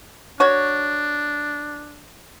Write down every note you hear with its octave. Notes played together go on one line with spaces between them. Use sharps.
D4 F#4 C#5